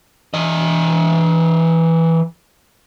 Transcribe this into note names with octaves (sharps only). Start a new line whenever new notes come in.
E3 D#5